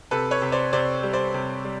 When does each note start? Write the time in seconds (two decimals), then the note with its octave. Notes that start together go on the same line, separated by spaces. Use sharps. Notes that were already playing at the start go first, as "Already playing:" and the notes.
0.11 C3 A4 B4
0.31 B4 C#5
0.42 C3
0.52 C5 D5
0.73 C3 C5 D5
1.03 G3
1.13 C5 D5
1.34 C3
1.64 G3